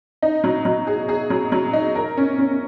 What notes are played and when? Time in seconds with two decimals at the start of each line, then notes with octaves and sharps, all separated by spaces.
0.22 D#4
0.44 F#3
0.65 F#3
0.87 G#4
1.09 G#4
1.30 F#3
1.52 F#3
1.73 D#4
1.95 A#4
2.17 C#4
2.39 C#4